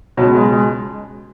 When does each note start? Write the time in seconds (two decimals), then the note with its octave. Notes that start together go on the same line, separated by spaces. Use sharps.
0.17 B2 F#3
0.21 C#2
0.35 G#3
0.52 G#3